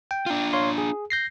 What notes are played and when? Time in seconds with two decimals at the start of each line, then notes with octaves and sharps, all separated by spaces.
0.11 G5
0.26 D4 F4
0.53 C#5 F5 C6
0.78 G#4
1.10 G6 A#6 C7